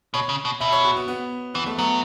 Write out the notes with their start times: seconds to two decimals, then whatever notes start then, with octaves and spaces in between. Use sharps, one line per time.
0.14 B2 C#5
0.29 C#3
0.45 B2
0.60 B2 E5
0.72 C#5
0.84 F#4
0.96 B3
1.08 B3
1.54 E3 B3
1.66 A3
1.78 F#3 B3